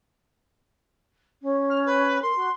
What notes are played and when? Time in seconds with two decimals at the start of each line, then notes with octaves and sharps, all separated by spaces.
1.41 C#4
1.69 F6
1.85 B4
2.22 A#4 C6
2.35 F#4